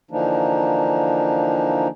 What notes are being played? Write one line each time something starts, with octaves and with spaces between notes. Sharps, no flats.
D3 E3 F3 A#3 D4 D#4